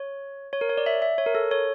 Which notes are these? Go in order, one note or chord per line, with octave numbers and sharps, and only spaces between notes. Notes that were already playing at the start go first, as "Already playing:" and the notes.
Already playing: C#5
C#5
A#4
C#5
D5
E5
E5
C#5
A#4
A4
C#5